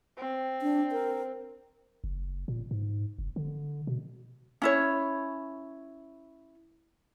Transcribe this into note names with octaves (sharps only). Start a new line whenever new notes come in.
C4
D4
A#4
F#1
A#2
G#2
F#1
D3
B2
C#4 E4 C#5